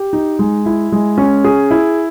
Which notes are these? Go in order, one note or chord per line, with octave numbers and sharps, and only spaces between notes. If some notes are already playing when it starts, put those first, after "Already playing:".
Already playing: G4
D#4
G#3
E4
G#3
C#4
G#4
E4